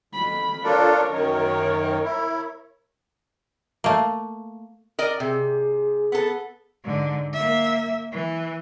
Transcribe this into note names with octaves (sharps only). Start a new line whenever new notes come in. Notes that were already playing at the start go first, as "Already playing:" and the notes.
F2 B5
D4 F4 A4 A#4 C#5
F#2 D#3
E4
A3 A#3
A#4 D5 D#5
C3 G#4
B3 A4
G#2 D3
A#3 E5
E3